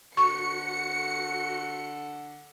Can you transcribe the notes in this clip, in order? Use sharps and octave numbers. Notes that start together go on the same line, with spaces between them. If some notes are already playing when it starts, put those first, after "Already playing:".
D3 F#4 C#6 C#7